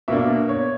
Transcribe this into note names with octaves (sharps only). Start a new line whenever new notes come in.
B2 A#3 D4 E5
C#5